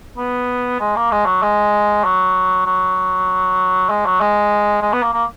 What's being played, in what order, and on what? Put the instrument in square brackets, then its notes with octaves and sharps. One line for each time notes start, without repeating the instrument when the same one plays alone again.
[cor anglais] B3
G#3
A#3
G#3
F#3
G#3
F#3
F#3
G#3
F#3
G#3
G#3
B3
A#3
A#3